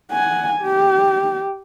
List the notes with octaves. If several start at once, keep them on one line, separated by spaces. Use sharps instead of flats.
F#5 G#5
G4